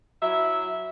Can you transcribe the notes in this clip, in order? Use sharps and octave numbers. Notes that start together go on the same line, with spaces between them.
F#3 E4 E5